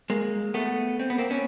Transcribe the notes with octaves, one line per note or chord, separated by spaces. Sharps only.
G#3 A#3
A3 B3
C4
B3
A#3 C4
B3 C#4